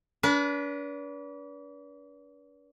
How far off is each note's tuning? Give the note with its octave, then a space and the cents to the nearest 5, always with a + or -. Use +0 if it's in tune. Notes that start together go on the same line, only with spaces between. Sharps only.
D4 -40 B4 -30